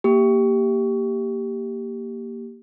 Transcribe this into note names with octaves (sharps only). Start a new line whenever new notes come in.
A#3 G4